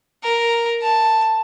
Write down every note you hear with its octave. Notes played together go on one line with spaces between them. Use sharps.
A#4
A5